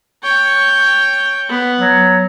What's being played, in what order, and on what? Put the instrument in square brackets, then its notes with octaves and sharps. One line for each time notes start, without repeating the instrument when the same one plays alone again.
[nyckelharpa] C#5 G5
B3
[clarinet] F#3